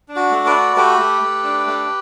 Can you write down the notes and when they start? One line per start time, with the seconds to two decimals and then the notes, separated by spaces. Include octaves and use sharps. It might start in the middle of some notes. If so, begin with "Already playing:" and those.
0.09 D4
0.16 F#4
0.31 A3
0.46 B4 D5
0.53 F#4
0.76 A3 G4 B4
0.99 A3
1.22 A3
1.44 D4
1.67 A3